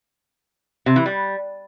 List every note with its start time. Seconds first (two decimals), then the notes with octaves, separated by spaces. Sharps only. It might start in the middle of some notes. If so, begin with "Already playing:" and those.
0.86 C3
0.96 E3
1.05 G3